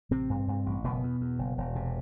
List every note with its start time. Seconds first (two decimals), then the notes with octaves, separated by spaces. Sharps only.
0.11 A1 C3 C4
0.29 G2
0.48 G2
0.66 A1
0.84 F#1 B2 B3
1.03 E2
1.21 E2
1.39 F#1
1.58 E1
1.75 C3